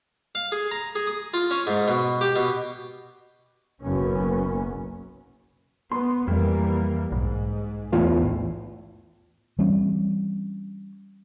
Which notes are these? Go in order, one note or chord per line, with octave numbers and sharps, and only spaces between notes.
F5
G#4
A#5
G#4
D#6
F4
C#4
G#2
B2
G4
B2
F#1 B1 F#2 A#3 B3 C#4
B3 C6
F2 E3 G3 A#3
B1 G#2
E2 A2 F4
E3 G3 C4 C#4